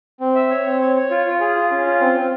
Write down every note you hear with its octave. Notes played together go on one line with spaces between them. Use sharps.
C4
E5
C#5
C4
C#5
C#5
F4
F4
G#4
F4
C#4
F4
C4
C4